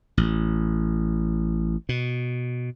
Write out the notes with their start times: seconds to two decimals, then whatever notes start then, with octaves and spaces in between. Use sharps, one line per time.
0.17 A1
1.89 B2